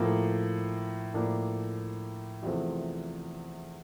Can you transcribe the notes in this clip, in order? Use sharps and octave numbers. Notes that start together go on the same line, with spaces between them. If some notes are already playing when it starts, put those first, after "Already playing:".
Already playing: A2 F3 A#3
A2 F3 A#3 D4
E2 C3 F3 A3 C4